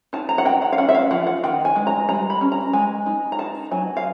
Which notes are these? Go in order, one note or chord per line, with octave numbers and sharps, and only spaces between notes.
D#4 A5
A#5
F#5
D#4 G5
F#5
F5
C#4 F#5
E5
F5
F3 F#5
F#5
D#3 G5
G#5
G#3
A#5
G3 A#5
B5
C#4
A#5
G#3 G#5
D#4
A#5
D#4 A5
F#3 G#5
F5